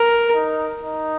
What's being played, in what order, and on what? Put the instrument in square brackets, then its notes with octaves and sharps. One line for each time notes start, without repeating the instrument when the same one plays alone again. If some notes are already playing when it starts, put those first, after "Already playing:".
Already playing: [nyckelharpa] A#4
[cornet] D#4
D#4